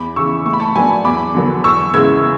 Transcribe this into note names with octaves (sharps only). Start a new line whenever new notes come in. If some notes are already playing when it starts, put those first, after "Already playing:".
Already playing: E2 B5 D6
C#3 E3 C#6 E6
A2 C#6
B5
A5 C#6
F#3 B3 D4 G#5 B5
E2 B5 D6
D3 F#3 B3
E2 C#6 E6
C#3 G#3 B3 E4 E6 G#6